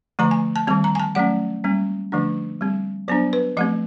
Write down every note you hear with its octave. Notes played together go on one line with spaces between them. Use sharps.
D3 F3 A3 A#5
G#5
A5
D#3 G3 C4 A5
A#5
G#5
A5
F#3 A3 C#4 F#5
G3 A#3 C#4
D3 F3 A3 D4
G3 C4
F#3 B3 D4 C5
B4
F3 A3 C4 D#5